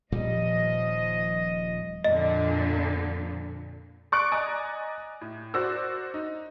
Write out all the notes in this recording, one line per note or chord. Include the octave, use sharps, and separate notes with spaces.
D#1 A#2 F3 G3 D#5
F2 A#2 D3 D#5
D5 C#6 F#6 D7
D5 D#5 G#5 A#5 D#6
A2
F#4 A#4 C5 D5 E6
D#4